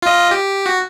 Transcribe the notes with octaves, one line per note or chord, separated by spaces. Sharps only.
F4 D#5
G4
F#4